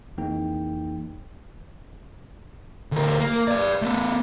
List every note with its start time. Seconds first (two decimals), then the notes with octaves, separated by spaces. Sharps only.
0.18 F2 E3 A#3 D#4 G#4 G5
2.92 D2 A#4
3.20 A#3
3.48 B4 D5
3.82 A3 B3